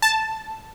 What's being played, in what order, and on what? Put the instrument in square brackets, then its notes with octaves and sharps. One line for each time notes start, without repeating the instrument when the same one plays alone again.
[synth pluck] A5